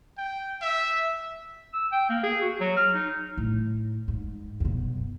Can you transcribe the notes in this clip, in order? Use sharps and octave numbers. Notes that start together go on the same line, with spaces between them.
G5
E5
E6
G5
A#3
G#4
F#4
F#3
F6
D#4
A2
G#2
F#2 B2